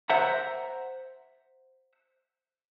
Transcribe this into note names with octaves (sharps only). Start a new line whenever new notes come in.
C5 E5 F#5 A#5